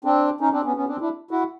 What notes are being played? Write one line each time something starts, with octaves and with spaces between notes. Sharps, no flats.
C4 D4
C#4 D#4
C4 D4
B3 C#4
B3 C#4
C4 D4
D4 E4
E4 F#4